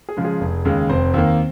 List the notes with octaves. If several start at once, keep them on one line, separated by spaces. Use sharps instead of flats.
G#4
C#3 F3 G#3
G#4
F1
D#2 C#3 G#3
F1 C4 C5
D#2 D#3 A#3